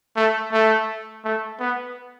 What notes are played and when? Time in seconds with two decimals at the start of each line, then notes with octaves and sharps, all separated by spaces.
0.16 A3
0.52 A3
1.24 A3
1.60 B3